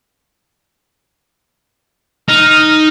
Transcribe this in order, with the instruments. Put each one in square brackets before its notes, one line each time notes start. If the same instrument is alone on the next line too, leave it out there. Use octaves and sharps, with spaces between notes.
[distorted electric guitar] D#4 [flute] F6